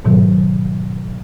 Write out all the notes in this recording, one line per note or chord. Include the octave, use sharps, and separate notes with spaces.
G#2 B2 D#3 F#3